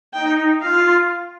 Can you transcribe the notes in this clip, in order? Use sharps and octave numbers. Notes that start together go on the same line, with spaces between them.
D#4 G5
F4 F5